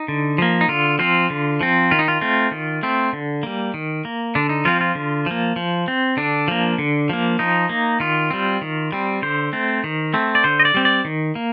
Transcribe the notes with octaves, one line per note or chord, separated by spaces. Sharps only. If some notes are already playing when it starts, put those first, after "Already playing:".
Already playing: D#4
D3
F3 A#3
D#4
D3 F4
F3 C4 F4
D3
F3 C4
D#3 F4
D#4
F4
A3 C4
D#3
A3 C4
D3
G3 A#3
D#3
A#3
D3 D4
D#4
F3 C4 F4
F4
D3
F3 A#3
F3
C4
D3 D4
F3 A#3
D3
F3 A#3
F3 D#4
A#3
D#3 F4
G3 C4
D#3
G3 C4
D3 C5
A3 C4
D#3
A3 C4
D5
D3 C5
D#5
D5
G3 C4
D5
D#3
A#3